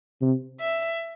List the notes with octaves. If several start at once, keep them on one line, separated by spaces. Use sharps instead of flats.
C3
E5